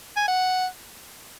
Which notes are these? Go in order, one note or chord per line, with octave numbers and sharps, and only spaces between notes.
G#5
F#5